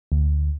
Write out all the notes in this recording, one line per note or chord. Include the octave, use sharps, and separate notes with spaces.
D2